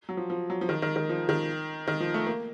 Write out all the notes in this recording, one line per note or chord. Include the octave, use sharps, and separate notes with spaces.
F#3
F3
F3
F#3
F3
D#3
D#3
D#3
F3
D#3
D#3
F3
A3
A#3